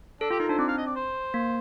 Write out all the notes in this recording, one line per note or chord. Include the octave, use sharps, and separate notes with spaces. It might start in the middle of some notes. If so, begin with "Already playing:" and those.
D4 A4
F4 G4
D#4 A#4
D4 C5
C4 D5
F5
D#5
D5
C5
A#3